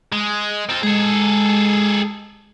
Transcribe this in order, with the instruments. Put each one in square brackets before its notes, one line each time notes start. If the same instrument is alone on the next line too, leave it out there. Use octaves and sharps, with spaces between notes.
[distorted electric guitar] G#3
C4 F4
[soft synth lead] G#3 [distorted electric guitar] G#4 A4